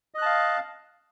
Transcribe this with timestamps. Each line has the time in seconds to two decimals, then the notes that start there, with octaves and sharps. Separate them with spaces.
0.14 D#5
0.18 F#6
0.22 A5
0.26 F5